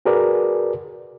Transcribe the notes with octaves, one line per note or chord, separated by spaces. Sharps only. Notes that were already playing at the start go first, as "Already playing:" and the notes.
F#4 G#4 A#4 B4 D5